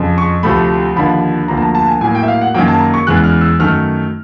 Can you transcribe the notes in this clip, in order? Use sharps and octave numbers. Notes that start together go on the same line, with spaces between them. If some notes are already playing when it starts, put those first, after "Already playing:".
Already playing: F2 C#3 F3
C#6
D2 C3 F3 A3 B5
D#2 D3 F3 B5
D2 D3 F3 A#3 A#5
A5
A#5
A5
G#5
A2 F#3 A#3 G#5
G5
E5
F5
F#5
F#2 D#3 F#3 A#3 G5
A5
A#5
C#6
E2 C#3 E3 G#3 F#6
F6
E6
F#2 D#3 F#3 A3 F6